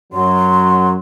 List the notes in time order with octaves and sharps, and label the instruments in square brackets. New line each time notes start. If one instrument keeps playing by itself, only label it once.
[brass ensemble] F#2 F#3 [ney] C6